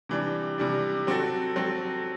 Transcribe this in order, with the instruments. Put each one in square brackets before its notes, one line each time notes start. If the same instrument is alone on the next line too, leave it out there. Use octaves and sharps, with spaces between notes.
[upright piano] C3 E3 G3 D4
C3 E3 G3 D4
F#3 C4 F#4 A4
F#3 C4 F#4 A4